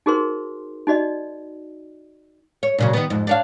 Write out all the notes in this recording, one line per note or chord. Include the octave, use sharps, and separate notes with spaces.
D#4 F#4 G#4 A#4 C5 C6
D#4 F#4 D5 D#5
C#5
A#2 C#3 F#3
D#3 B3
F2 G#2
D4 C#5 F5